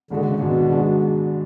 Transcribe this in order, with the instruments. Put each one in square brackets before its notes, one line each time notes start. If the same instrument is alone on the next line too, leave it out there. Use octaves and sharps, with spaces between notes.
[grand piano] G#1 G#2 G#3 D4 F#4 [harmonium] D3
[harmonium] C#3
[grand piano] G#1 G#2 G#3 D4 F#4 [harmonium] B2
[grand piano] G#1 G#2 G#3 D4 F#4